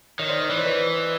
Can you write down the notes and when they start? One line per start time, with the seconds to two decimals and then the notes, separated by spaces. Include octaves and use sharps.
0.19 D#3 C#5 D#5
0.29 C5 D5
0.40 D5
0.49 E3 C#5
0.57 C5
0.65 B4 C#5